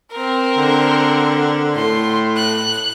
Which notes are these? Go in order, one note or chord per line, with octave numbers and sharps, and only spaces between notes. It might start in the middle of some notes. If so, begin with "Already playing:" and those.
C4 A#4
D3
A2 C6
F#6